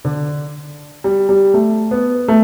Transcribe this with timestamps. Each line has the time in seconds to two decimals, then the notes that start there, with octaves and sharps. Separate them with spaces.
0.05 D3
1.04 G3
1.29 G3
1.54 A3
1.91 B3
2.28 A3